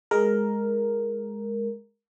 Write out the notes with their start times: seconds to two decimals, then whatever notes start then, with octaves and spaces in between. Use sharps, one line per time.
0.11 G#3 A#4